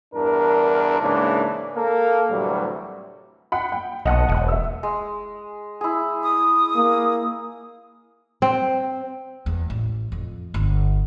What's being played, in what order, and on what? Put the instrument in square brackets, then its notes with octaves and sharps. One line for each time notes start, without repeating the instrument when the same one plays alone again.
[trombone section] E2 G2 D4 A#4
G#2 C#3 E3 G#3 A#3 D4
A#3 A4 A#4
D2 A2 C3 E3 F#3 G3
[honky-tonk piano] F#5 G5 B5
G5
[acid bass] B1 [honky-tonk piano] D#5 F#5 A5
[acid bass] E1
[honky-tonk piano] E5 E6
[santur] G#3
E4 G#4
[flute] D#6
[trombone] A#3
[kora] C4
[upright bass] E2
A1
F2
G1